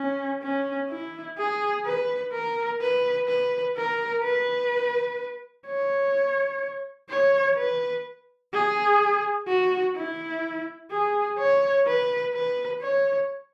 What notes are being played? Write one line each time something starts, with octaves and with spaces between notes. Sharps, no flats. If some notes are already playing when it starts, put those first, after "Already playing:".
Already playing: C#4
C#4
E4
G#4
B4
A#4
B4
B4
A#4
B4
C#5
C#5
B4
G#4
F#4
E4
G#4
C#5
B4
B4
C#5